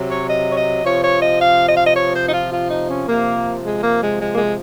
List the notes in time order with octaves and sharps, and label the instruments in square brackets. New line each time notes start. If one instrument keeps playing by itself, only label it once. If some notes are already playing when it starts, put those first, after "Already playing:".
Already playing: [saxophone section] C3 F#3
C#5
D#5
C#5
D#5
C3 F3 C#5
C#5
D#5
F5
D#5
F5
D#5
C#5
C5
D#4
F4
F4
D#4
C#4
C3 F3 A#3
G#3
A#3
G#3
G#3
A#3
G#3